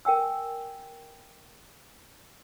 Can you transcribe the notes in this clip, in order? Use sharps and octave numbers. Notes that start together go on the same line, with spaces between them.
A#4 G5 G#5 E6